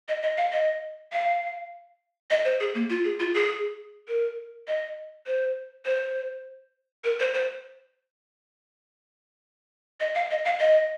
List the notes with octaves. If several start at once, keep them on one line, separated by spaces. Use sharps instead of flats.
D#5
D#5
F5
D#5
F5
D#5
C5
G#4
A#3
F4
G#4
F4
G#4
A#4
D#5
C5
C5
A#4
C5
C5
D#5
F5
D#5
F5
D#5